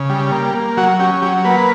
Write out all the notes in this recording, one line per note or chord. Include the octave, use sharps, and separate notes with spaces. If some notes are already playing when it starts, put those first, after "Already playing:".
Already playing: C#3
G3
A#3
A#3
F#3 F#4
C#4 G4
F#3 G4
A#3 B4